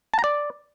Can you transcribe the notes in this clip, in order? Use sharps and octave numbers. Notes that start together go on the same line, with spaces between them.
A5
A#5
D5